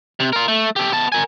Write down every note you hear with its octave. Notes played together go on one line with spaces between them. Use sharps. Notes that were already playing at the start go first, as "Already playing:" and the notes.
C3
F4 A#4
A3
G4 A4
B3 A5
A#4 G#5